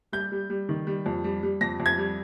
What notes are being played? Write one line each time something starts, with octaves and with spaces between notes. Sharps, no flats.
G3 G6
G3
G3
D#3
G3
F2
G3
G3
F2 A#6
F2
G#6
G3